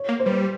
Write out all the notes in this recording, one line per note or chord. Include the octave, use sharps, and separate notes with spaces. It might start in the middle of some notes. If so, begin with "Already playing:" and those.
Already playing: C#5
A#3
C5
G3 B4